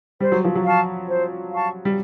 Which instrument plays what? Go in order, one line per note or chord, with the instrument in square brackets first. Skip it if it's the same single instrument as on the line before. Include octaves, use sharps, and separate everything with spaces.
[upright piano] G3 [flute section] C5
[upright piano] F#3
F3
F#3
[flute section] F5 A5 C#6
C5
F5 A5 C#6
[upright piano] G3